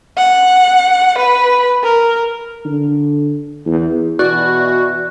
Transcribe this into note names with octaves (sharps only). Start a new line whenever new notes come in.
F#5
B4
A#4
D3
E2
B2 E3 F#4 D5 F#6